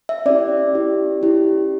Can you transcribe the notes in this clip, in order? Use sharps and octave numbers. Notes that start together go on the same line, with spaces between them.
E5
C#4 E4 G4 D5
C#4 E4 G4
C#4 E4 G4